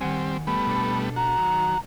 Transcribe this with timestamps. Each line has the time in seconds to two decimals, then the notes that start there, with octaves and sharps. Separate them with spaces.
0.01 D#3 G3 C4 F#5 G#5
0.47 G3 A3 B3 B5
0.67 B2 D4 A4
1.16 F#4 A#5
1.38 D#3 F#3